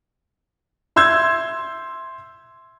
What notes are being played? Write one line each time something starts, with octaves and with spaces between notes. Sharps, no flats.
E5 C6 E6 G6 G#6